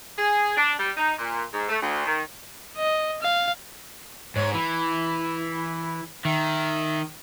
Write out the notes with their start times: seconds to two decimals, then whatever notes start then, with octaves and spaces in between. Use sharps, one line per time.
0.17 G#4
0.56 D4
0.78 G3
0.97 D#4
1.18 A#2
1.53 G#2
1.69 A3
1.81 D2
2.06 D#3
2.78 D#5
3.22 F5
4.36 G#2 C#5
4.54 E3 E4
6.25 D#3 E5